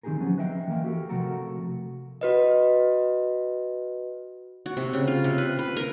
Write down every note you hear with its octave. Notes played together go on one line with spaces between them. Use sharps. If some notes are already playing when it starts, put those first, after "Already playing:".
D#3 C4 D#4 G4 G#4 A#4
F3 F#3 B3 C#4
B4 D#5 E5 G5
E3 A#3 A#4 F5 G5
F#4 G4 A4 A#4
C3 F3 A3 F#4 A4 A#4
F#4 B4 D#5
F#4
C3
C#3
F4
C3
B4
B4
A#4